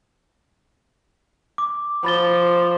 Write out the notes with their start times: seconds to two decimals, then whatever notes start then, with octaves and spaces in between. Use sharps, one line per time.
1.58 D6
2.05 F3 B5 A6 G7